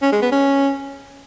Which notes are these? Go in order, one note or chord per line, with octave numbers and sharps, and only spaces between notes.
C#4
G#3
B3
C#4